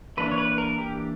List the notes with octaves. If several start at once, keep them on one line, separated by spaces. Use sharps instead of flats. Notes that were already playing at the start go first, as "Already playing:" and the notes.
E3 A#3 D4 B4
C#5
B4
A#4
G4